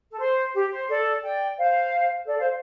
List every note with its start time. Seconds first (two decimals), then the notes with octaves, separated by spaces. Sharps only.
0.11 A4
0.19 C5
0.54 G4
0.72 C5
0.88 A4 D5
1.23 D5 G5
1.57 C5 F5
2.26 A4 D5
2.38 C5 F5